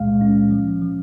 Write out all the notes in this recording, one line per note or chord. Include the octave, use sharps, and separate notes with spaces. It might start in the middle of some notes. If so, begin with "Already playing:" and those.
Already playing: C#2 A#2 G#3 F5
C#4
F3
F3